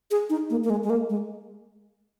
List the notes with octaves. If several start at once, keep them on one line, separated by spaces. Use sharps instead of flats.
G#4
D#4
A#3
A#3
G#3
G#3
A#3
G#3